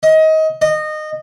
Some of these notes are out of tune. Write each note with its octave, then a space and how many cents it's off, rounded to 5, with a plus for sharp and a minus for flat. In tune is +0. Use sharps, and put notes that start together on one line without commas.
D#5 +25
D#5 -20